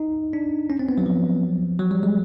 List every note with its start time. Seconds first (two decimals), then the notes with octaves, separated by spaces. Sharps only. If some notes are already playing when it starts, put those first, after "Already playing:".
Already playing: D#4
0.33 D4
0.70 C#4
0.79 C4
0.89 B3
0.98 F#3
1.06 F3
1.79 F#3
1.91 G3
2.03 G#3